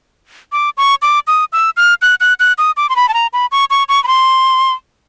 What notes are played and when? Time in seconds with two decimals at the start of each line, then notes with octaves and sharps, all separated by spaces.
0.52 D6
0.77 C#6
1.02 D6
1.27 D#6
1.53 E6
1.77 F6
2.02 F#6
2.20 F#6
2.40 F#6
2.58 D#6
2.77 D6
2.89 C6
2.96 B5
3.09 A5
3.14 A#5
3.33 B5
3.52 C#6
3.70 C#6
3.89 C#6
4.04 B5
4.08 C6